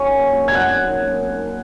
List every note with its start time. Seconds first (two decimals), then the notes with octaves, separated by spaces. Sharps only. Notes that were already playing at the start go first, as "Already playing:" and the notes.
Already playing: F#3 C#4 G#4 C#6
0.08 A#2
0.32 F#3 C#4 G#4
0.48 G#6
0.55 F#2 F#5 F#6
0.78 F#3 A#3
1.02 F#2
1.25 F#3 A#3